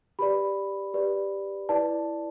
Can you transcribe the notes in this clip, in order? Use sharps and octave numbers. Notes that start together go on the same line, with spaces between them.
G4 B4 D5 B5
G4 B4 D5
E4 B4 D5 A5